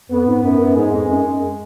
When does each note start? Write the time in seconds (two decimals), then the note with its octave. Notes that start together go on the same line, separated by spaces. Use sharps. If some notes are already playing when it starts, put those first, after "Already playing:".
0.10 F2 B3
0.26 G#2
0.43 F#2
0.59 F#2
0.76 G#2 G#3
0.92 F2
1.08 F#2
1.24 F#2